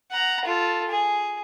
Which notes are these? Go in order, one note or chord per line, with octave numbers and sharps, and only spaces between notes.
F#5 A#5
F4 A4
G#4